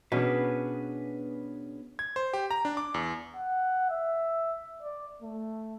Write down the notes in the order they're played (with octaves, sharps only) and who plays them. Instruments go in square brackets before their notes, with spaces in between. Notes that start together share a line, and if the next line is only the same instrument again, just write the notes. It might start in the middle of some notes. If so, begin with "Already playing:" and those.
[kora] B2 [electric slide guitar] B3 G#4 B4 [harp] C#4 D4
[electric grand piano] G#6
C5
G4
A#5
D4
D6
E2
[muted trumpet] F#5
E5
D5
A3